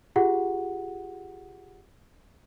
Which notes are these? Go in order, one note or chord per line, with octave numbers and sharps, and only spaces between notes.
F4 G4 G#4 F#5